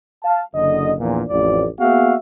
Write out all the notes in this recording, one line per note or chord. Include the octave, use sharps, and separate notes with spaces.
F5 A5
F#1 D3 D#5
A#1 E2 A#2
A1 F2 D5
A#3 B3 F#4 G#4 E5 F5